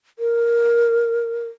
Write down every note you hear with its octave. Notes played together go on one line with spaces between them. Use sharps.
A#4